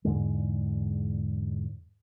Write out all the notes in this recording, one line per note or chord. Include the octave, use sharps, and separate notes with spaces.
E2 G#2 D3 G#3